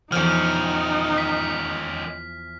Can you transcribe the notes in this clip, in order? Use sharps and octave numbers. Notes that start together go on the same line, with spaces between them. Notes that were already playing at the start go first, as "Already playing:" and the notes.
E2 D#3 F3 C#4 D#4 F6
B6